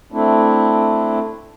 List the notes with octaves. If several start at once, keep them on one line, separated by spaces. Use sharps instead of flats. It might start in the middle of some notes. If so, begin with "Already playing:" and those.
A3 C4 D4 E4